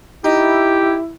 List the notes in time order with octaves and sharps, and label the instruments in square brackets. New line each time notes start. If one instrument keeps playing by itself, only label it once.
[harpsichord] D#4 [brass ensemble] E4 [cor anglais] G4